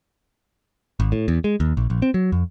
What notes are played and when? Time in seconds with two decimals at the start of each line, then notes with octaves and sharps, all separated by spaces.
1.00 G#1
1.12 A2
1.28 E2
1.44 G#3
1.60 D#2
1.77 A#1
1.90 A#1
2.02 C4
2.14 F#3
2.32 F2